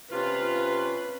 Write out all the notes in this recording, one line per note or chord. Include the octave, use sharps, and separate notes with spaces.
C3 C#4 F4 B4